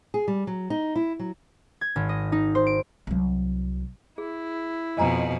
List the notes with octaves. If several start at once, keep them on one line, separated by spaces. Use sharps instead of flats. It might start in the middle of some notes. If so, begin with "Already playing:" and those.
G#4
G3
F#3
D#4
E4
F#3
G#6
G#1
D#5
D#4
C5
D7
C2 F#3
E4 G#4
F2 B2 D#5 G#5 A#5